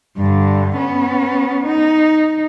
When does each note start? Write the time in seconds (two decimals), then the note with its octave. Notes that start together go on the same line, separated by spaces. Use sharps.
0.17 G2 D3
0.77 B3 C#4
1.66 D#4